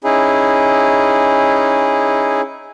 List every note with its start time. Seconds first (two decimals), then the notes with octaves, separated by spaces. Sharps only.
0.04 C#4 D#4 E4 G#4